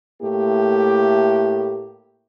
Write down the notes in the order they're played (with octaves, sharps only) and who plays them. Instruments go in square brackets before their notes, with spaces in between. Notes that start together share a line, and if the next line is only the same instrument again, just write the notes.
[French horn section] A2 A3 A#3 E4 G4